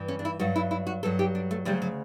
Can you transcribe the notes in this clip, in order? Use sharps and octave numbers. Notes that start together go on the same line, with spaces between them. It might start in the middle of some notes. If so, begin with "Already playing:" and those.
Already playing: G2 E3
C#4
D4
E4
G2 F#3 F#4
E4
E4
F#4
G2 F#3 A4
G4
D4
A3
D2 C#3 F#3 G3
F#3